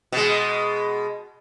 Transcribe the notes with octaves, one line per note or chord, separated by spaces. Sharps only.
B2 G#3